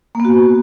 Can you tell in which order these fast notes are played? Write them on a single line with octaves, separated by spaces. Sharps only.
A#3 B3 F#4